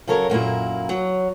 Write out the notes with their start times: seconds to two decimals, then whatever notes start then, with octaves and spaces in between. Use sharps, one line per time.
0.07 C#3 F#3 A4 A#4 C#5
0.30 F#2 A#2 A#3 E4
0.89 F#3